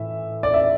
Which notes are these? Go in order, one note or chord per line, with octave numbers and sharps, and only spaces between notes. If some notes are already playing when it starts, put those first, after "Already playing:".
Already playing: A2 E3 E5
D5
E5